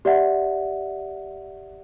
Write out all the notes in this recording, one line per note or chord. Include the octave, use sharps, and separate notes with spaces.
G4 D5 E5 F#5